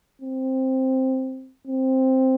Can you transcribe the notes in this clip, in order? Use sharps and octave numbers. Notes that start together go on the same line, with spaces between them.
C4
C4